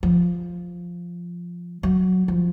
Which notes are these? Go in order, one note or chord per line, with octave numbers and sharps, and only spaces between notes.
F3
F#3
F3